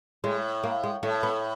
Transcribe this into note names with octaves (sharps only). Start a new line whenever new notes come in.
A2 G#3
A#3
G#3
A2 A3
B3